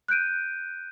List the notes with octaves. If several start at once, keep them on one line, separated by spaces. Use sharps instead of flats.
F#6 G6 D7 D#7